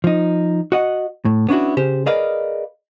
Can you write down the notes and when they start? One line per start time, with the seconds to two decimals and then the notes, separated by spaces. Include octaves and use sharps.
0.04 F3 D#4
0.72 F#4 D#5 F#5
1.25 A2
1.49 B3 C#4 D4 E4 F#4
1.77 C#3 G4 C5
2.06 G#4 A#4 B4 D5 D#5 F5